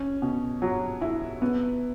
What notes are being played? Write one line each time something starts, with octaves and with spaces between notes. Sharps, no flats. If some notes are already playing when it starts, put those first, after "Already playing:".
Already playing: C#4
B2
F#3
E4
B3